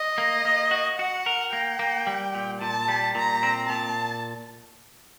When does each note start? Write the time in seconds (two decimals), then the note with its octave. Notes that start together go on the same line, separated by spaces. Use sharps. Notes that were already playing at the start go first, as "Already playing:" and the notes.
Already playing: D#5
0.18 A#3
0.45 A#3
0.71 F#4
0.99 F#4 F#5
1.26 A#4
1.53 A#3 G5
1.79 A#3
2.07 G3
2.35 A#2
2.61 A#2 A5
2.88 G3
3.15 A#2 A#5
3.43 C4
3.69 A#2 A5